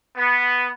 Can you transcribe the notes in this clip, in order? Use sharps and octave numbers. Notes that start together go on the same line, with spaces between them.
B3